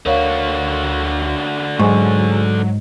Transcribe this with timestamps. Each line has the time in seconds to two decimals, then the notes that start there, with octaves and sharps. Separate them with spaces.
0.06 D2 D3 F#4 A#4 C#5 F5
1.79 G#2 F#3 G#4 G#5 C#6